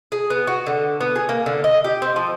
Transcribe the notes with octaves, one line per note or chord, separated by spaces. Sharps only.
G#4
B3
F#4
D3
B3
G#4
A#3
D3
D#5
G4
C4
F3